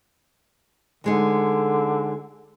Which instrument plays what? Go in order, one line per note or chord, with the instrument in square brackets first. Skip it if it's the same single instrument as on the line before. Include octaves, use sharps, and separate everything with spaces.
[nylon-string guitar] D2 G#3 D#4 [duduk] D3